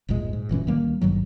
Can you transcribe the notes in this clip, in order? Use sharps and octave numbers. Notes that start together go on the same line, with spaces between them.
G1 D#2 A#2 G#3
G#2
F#1 A#2 E3 C#4
C#2 D#3 G3 A#3
G#1 G2 D#3 F#3